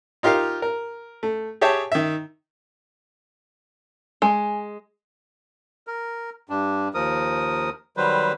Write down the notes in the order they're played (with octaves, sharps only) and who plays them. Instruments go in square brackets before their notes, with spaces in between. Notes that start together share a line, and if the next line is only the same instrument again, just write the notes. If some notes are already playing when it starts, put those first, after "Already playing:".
[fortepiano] D#4 F4 G4 A#4 F5
A#4
A3
G4 G#4 C#5 E5 G5 A5
D#3 E5
[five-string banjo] G#3 [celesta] G#5
[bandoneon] A#4
G2 D4
D#2 F3 A#4 D#6
D#3 F#3 G3 B4 C5